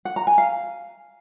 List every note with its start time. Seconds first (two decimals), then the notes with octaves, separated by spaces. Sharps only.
0.05 F#5
0.16 A#5
0.27 G#5
0.38 F5